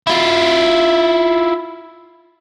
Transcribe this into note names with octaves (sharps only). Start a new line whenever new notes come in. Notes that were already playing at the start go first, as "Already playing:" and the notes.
E4 F4